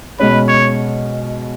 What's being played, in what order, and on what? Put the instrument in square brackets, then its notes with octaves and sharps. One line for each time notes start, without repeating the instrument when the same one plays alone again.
[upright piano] B2 G#3 C#4 [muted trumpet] B4
[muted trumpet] C#5